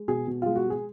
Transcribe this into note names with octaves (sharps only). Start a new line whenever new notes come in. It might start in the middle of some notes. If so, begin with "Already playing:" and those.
Already playing: G#3
B2 G#4
B2
G#3 F4
F#4
G#3
G#4